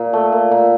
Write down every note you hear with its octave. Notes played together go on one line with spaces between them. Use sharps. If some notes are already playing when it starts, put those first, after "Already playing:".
Already playing: A#2
A3
A#2
A#2